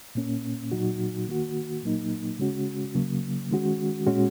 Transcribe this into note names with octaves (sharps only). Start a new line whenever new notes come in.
A#2 A#3 C#4
A#2 F#3 D#4 F#4
D#3 A#3 F#4
A#2 F#3 A#3 D#4
C#3 G#3 C#4 F#4
C#3 F#3 A#3
D#3 G#3 C#4 F#4
A#2 G#3 C#4 F#4